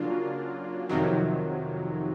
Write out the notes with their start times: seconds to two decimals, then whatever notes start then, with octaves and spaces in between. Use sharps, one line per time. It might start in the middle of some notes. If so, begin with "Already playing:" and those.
Already playing: C#3 F#3 A#3 D4 F4
0.89 F2 C3 D#3 F#3